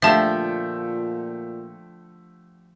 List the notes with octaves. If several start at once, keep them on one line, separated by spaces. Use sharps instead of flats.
A#2 D3 F3 A3 G4 E5 A5